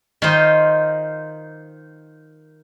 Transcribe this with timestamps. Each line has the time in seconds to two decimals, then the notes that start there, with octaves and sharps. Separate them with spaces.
0.22 D#3 D#4 F4 C5 D#5